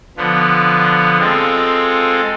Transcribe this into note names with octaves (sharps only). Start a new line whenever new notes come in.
D3 F3 B3
G#3 C4 F4 A4